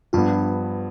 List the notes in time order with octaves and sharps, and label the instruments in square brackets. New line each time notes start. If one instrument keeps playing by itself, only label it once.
[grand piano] G2 F3 B3 [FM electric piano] D4 F4